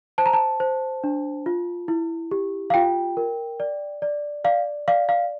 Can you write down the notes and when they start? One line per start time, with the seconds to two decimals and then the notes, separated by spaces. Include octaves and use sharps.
0.18 C5 A5
0.26 A#5
0.33 A5
0.60 C5
1.04 D4
1.46 F4
1.88 E4
2.31 G4
2.70 F5
2.74 F4 G5
3.17 A#4
3.60 D5
4.02 D5
4.44 D5 F5
4.88 D5 F5
5.09 F5